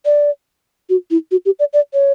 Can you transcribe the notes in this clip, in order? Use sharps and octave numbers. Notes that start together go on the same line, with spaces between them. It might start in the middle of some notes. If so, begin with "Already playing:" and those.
D5
F#4
E4
F#4
G4
D5
D5
C#5